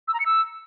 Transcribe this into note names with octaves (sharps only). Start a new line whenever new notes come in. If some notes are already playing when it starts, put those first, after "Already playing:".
E6
A#5
C#7
E6